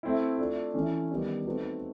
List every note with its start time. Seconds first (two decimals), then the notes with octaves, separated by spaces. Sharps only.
0.03 A3 C4 E4
0.38 A3 D4 F4
0.74 E3 A3 C#4 E4
1.09 D#3 G3 B3 D4
1.46 A3 C4 D#4 F#4 B4